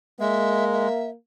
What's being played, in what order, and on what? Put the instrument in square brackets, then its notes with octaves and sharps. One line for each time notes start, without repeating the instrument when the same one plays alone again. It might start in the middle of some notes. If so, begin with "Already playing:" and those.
[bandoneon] G#3 [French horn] A#3 [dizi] E5
[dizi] E5